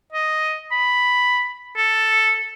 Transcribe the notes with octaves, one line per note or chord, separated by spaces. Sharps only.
D#5
B5
A4